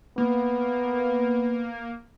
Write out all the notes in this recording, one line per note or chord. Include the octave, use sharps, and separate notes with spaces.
A#3 B3